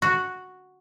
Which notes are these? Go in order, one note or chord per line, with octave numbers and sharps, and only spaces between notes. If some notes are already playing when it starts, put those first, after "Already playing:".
F#4